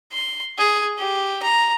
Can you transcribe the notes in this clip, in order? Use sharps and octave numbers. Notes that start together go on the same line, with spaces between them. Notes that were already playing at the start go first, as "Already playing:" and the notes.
C6
G#4
G4
A#5